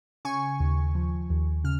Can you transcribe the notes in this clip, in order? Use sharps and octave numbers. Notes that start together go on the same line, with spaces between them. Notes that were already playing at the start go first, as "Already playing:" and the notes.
C#3 G#5 C#6
D#2
F3
D#2
C#3 F6